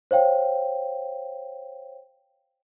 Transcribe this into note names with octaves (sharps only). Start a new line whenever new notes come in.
C5 C#5 F5 G5